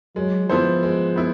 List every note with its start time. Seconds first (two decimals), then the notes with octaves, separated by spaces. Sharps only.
0.16 F#3 G#3
0.49 F3 B3 E4 A4 C5
0.83 G#3
1.16 B3 E4